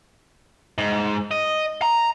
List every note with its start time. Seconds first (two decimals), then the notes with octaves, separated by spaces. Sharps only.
0.78 G#2
1.31 D#5
1.82 A#5